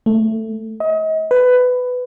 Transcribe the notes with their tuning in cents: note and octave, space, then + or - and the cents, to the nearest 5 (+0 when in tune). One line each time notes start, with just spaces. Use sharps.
A3 +10
D#5 +35
B4 +15